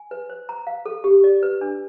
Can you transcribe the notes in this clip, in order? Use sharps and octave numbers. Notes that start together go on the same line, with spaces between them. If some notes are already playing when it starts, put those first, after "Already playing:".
Already playing: G#5
B4
C5
A#5
F5
A4
G4
D5
B4
D4